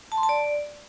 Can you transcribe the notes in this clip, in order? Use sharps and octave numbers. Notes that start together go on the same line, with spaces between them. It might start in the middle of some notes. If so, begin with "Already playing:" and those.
A5
C6
A5
D5